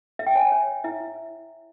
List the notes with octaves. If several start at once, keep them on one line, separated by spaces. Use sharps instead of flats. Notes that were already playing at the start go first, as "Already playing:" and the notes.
E5
G5
C#5 G#5
C#5
C#5
E4 E5
E4